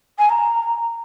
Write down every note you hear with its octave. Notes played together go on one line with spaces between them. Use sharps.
G#5
A#5